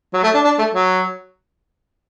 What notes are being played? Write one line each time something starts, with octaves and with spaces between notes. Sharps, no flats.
F#3
A3
D4
D4
A3
F#3